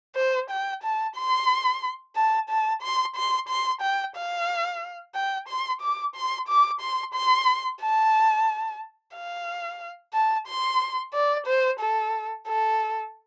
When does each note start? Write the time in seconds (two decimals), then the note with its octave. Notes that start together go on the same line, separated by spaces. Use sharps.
0.16 C5
0.50 G5
0.83 A5
1.16 C6
2.16 A5
2.50 A5
2.83 C6
3.16 C6
3.49 C6
3.82 G5
4.16 F5
5.15 G5
5.49 C6
5.81 D6
6.16 C6
6.48 D6
6.81 C6
7.14 C6
7.81 A5
9.15 F5
10.13 A5
10.47 C6
11.14 D5
11.47 C5
11.80 A4
12.47 A4